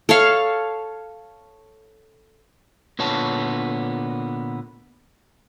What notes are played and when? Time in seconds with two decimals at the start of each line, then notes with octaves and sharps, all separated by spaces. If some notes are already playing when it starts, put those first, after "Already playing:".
0.09 A4 C#5 F5
2.99 A#2 D3 B3 C#5 A5